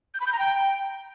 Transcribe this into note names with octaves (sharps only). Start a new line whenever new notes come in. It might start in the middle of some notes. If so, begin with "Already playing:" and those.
G6
B5
G6
A#5
G5